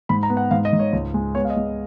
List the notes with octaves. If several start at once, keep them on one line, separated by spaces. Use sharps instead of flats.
G#2 B5
A#5
B3
F#5
G#2 F5
D#5
G#2
C#5
C#2
G#3
B3 C#5
F5
D#5
G#3